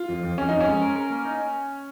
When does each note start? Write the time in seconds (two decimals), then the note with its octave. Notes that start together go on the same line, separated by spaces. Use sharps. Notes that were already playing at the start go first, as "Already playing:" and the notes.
Already playing: F4
0.09 F2
0.23 F2
0.37 F2 C#4
0.49 F2 D#4
0.60 C#4
0.67 G#3
0.82 A#4
0.96 A#4
1.10 A#3
1.25 D#4